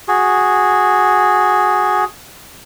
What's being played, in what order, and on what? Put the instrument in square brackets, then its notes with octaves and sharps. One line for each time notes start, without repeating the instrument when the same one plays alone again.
[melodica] F#4 G#4